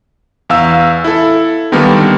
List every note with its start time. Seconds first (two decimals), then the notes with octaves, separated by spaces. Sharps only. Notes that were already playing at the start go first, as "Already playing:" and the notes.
0.50 E2 F5 E6
1.04 E4 A4
1.72 D3 D#3 G3 A#3 B3